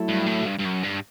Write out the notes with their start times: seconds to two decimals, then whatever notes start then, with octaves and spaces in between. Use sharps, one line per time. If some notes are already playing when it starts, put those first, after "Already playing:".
Already playing: F#3 A3 E4 A4
0.09 G2
0.27 A2
0.46 G2
0.59 G2
0.65 F#2
0.83 G2